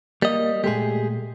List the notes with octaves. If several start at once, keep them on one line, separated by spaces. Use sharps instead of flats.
G3 A#3 D#5
A#2 G#3 A3 G4 G#4